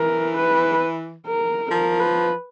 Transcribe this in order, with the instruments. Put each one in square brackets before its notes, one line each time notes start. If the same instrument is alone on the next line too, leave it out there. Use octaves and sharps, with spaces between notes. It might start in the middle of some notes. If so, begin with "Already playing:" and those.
Already playing: [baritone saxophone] E3 [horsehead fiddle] A#4
[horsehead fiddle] B4
A#4
[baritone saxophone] F3 [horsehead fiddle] A#4
[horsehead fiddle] B4